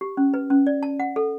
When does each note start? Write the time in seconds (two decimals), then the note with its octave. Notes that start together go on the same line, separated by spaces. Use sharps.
0.01 G4
0.17 C#4
0.34 B4
0.50 C#4
0.67 D5
0.83 A5
1.00 F#5
1.16 A4